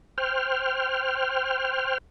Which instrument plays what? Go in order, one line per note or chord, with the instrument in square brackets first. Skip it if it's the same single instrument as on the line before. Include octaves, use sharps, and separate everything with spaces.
[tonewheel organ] C5 G5 F6